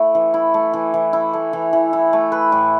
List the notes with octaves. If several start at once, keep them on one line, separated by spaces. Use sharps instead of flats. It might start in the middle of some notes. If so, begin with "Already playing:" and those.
Already playing: A3 E4
E3
E4
A3
E3
E3
E4
A3
E3
E3
E4
A3
B4
A2